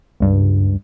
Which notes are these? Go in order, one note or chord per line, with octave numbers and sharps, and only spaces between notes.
C#2 G2